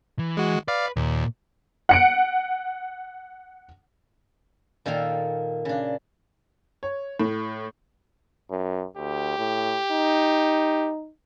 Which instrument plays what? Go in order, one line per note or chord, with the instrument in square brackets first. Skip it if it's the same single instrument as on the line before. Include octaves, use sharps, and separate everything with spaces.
[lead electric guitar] E3
[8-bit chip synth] G#3 F#4
[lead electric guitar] B4 [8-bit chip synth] D5 F5
[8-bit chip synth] D#2 [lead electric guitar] A#2
[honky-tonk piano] F#5 C#7 D7
[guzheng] A#2 D#3 A4 F5 G5
C#3 D4
[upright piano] C#5
A2
[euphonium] F#2
[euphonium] D2 [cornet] G4
[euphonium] A2
D#4